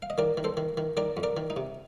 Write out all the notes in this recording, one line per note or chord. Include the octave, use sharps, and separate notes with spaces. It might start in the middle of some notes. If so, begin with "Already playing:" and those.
F5
D#5
D#3 A#4 D5
D#3
A4 C5
D#3
D#3
D#3 A#4 D5
F2
A#4 D5
D#3
D#4
C3